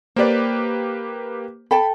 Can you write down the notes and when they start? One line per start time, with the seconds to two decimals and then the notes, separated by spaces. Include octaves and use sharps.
0.16 A#3 G4 B4 C5 D5
1.71 A4 G5 A5 B5